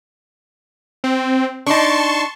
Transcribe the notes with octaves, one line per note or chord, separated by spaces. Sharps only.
C4
D4 D#4 A5 C6 C#6